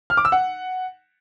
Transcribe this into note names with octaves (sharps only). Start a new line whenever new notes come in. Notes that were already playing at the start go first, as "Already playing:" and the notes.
F6
D6
E6
F#5